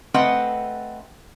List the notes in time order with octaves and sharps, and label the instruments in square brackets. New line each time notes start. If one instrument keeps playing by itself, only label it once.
[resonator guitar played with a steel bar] A3 C4 B4 D#5 F#5